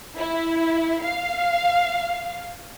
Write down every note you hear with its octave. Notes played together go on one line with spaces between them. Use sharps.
E4
F5